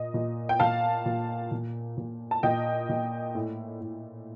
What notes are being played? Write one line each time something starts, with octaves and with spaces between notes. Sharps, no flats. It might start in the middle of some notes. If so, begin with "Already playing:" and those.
Already playing: A#2 D#5
A#2
G5
A#2 F5 A5
A#2
A#2
A#2
A5
A#2 D#5 G5
A#2
A2
A2